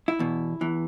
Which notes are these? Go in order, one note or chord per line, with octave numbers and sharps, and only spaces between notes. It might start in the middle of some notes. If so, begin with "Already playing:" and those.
E4
E2 B2
E2 E3